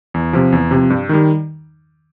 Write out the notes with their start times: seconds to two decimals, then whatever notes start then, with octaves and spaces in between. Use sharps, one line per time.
0.14 E2
0.33 C3 F3
0.52 E2
0.71 C3
0.76 F3
0.90 G2
1.09 D#3 G3